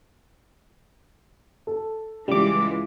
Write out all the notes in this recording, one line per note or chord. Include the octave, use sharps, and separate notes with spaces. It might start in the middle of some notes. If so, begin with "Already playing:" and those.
A4
C#2 E3 G3 G#3 D6